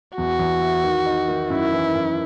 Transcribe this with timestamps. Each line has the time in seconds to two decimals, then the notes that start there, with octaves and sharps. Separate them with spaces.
0.17 E2 F#4
0.39 E2
0.62 E4
0.83 D#3
1.06 D#4
1.28 D#3
1.50 F#2 E4
1.72 E3
1.95 F#2